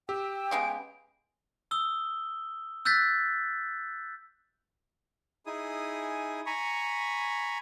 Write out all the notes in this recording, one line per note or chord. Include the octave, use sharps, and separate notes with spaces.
G4 G5 E6
C#3 G#3 B3 D7
D#6 E6 G7
E6 F#6 G6 A6 B6
D#4 E4 G#4 G#5 D#6
G#5 A#5 B5 C#6